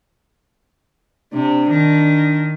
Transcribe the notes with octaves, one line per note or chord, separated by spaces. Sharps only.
C3 D4
D#3